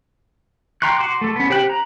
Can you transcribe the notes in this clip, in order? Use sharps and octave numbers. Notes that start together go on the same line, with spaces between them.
G5 A#5 C6 C#6 F#6
F#4 C6 D6
A3 A4
B3 C#4
G4 C5 G5 F#6
A#5